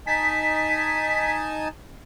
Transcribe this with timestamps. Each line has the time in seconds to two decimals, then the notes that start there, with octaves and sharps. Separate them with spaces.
0.07 D#4 G#5 A5 B6